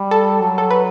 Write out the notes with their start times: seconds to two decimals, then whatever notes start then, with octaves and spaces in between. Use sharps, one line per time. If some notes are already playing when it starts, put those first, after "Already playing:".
Already playing: G3
0.11 A4
0.40 F#3
0.58 A4
0.71 B4